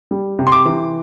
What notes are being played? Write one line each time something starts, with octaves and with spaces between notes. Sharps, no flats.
G3
C3
C6
D6
E3